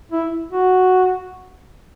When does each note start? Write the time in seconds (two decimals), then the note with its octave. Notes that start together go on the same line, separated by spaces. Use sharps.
0.12 E4
0.52 F#4